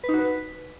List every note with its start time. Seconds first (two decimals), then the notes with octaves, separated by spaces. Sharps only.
0.04 B4
0.09 D#4
0.14 F#4
0.19 B4